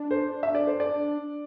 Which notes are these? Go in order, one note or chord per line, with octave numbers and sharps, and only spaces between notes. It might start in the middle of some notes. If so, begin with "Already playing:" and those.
Already playing: D4
C5
E5
D5
C5
D5